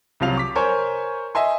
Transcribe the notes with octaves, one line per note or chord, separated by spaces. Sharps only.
C2 C3 F3 F#3 F5 F7
D6 B6
A#4 C5 C#5 G#5 C#6
D#5 E5 G#5 C6